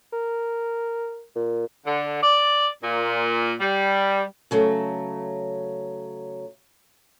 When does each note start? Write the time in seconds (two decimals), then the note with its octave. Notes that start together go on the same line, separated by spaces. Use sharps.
0.13 A#4
1.35 A#2
1.86 D3
2.23 D5
2.83 A#2
3.60 G3
4.51 C#3 F#3 A3